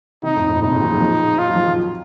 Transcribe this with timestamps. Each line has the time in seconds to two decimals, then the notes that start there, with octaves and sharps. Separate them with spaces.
0.23 C3 D#3 D#4
0.36 F2 A2
0.49 F2 A2
0.55 A#2
0.62 A2 C3 D#4
0.72 A#2 C#3
0.81 D#3 F#3
0.90 C#3 F3
1.00 C#3 F3
1.39 F4
1.47 F#3
1.55 F3
1.63 D#3 F#3